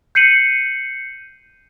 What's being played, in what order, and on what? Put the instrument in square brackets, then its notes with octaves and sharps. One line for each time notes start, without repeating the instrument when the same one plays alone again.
[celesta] G6 C7 C#7 D#7 F#7